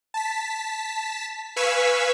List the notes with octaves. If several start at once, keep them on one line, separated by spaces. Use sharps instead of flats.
A5 B6
B4 F5 G#5 C#6 E6 B6